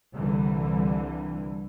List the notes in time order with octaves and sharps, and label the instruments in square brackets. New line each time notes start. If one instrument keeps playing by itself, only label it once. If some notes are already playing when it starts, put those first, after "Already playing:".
[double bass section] C2 D3 E3 G3